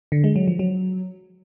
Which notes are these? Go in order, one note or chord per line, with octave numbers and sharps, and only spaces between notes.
D3
G#3
F#3
F3
F#3